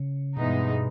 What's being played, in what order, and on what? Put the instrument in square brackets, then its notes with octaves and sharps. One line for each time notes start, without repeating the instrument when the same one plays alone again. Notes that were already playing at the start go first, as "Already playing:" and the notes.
Already playing: [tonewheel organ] C#3
[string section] G2 E3 G#3 B3 D#4 [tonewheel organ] B2